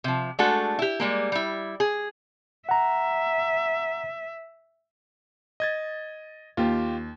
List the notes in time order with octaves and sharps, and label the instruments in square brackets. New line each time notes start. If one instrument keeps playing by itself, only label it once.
[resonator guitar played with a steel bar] C3 F3
G#3 A3 D4 F#4 A4
E4 G4
G3 G#3 A#3
G3 E4
G#4
[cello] E5 [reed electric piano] F#5 A#5
[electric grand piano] D#5 G#6 A6
[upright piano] D#2 [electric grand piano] F4 G4